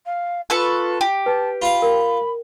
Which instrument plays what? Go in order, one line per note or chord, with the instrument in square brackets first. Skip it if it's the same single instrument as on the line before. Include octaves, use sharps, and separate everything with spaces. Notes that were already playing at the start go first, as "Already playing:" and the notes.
[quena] F5
[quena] F4 [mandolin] A4 B4 C#6
[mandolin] G4
[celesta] B4 [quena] A5
[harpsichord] F4 F5 [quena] B5
[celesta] A#4